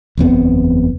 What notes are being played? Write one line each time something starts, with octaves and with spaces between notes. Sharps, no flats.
F#1 E2 B3 C4